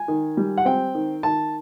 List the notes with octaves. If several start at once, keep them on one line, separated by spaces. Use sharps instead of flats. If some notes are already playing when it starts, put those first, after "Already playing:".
Already playing: G#5
D#3
G3
F#5
C4 G5
D#3
D#3 A5